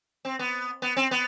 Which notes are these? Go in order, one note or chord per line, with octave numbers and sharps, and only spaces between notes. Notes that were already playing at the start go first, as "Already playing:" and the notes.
C4
B3
B3
C4
B3